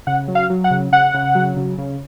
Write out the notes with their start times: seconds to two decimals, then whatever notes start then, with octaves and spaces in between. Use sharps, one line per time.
0.07 C#3 F#5
0.28 F#3
0.35 F5
0.50 F#3
0.64 F#5
0.71 C#3
0.92 C#3 F#5
1.14 C#3
1.35 F#3
1.57 C#3
1.78 C#3